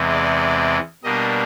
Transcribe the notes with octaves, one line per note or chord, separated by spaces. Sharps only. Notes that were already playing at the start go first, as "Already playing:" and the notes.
Already playing: E2 C3 E3 G#3
D5
B2 G3 A#3 D4 D#5